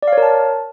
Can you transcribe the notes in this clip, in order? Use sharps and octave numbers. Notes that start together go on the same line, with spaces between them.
D5
F5
C#5
A#4
A5